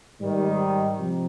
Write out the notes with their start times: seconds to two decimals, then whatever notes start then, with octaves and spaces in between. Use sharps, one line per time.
0.19 G#2 D#3 G3
0.97 C3 F3